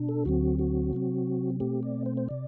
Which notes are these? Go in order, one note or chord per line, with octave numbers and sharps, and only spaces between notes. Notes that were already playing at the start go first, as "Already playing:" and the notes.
Already playing: B2 D4
A4
D2 D3 F#3 C4 F#4
F#4
C3 F#3 C4
B2 A3 C4 G4
D5
C5
C5
C3 D5